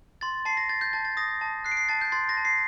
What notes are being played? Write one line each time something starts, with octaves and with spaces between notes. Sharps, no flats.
C6 A6
A5 C7
A#6
G6 A6
G6
A5 A6
A6
D#6 A#6
A5
F#6 C7
D7
C7
A5 A6
G6
C6 A6
A#6
A5
C7